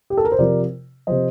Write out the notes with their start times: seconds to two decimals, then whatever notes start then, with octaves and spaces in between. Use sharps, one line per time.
0.10 G4
0.17 A4
0.25 A#4
0.32 C5
0.38 C3 F3 A#4 D5
1.07 C3 F3 C5 D#5